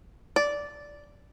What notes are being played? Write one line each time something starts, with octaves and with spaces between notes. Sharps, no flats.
D5